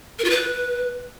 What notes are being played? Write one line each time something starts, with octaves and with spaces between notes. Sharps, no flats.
A#4
F4
B4